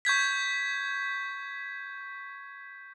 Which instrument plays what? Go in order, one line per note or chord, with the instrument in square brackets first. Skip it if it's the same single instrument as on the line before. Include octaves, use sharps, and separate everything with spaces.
[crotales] C#6 G6 G#6 B6